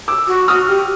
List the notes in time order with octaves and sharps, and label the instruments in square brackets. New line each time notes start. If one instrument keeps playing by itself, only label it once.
[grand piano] D6 E6
[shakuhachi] F#4
[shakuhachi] F#4 [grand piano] D#6 F6
[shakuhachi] G4